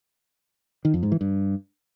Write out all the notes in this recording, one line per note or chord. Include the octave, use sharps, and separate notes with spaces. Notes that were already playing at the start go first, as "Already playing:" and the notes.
D#3
F2
G#2
E3
G2